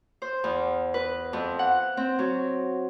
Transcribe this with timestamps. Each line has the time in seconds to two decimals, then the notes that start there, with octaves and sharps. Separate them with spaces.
0.22 C5
0.44 E2
0.94 B4
1.33 F2
1.59 F#5
1.97 C4
2.19 F#3